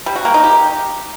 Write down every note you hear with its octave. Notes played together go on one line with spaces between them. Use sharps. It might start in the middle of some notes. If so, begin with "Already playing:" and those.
G3
F#4
A#3
D#4
G4